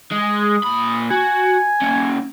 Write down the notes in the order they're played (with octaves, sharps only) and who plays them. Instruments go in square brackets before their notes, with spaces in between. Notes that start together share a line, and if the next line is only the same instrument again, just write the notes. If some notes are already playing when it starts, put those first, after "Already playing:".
[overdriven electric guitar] G#3 [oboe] D#6
[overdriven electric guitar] A#2 B5
[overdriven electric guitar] F#4 [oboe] G#5
[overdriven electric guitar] A#3 C#4